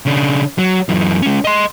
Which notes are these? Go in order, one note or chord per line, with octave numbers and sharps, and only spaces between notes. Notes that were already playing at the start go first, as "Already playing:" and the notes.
C#3 D4
F#3
F#2 E3
G#3 C#4
D#5 C6